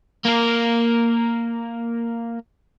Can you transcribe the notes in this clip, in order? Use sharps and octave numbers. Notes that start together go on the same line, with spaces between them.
A#3 A#4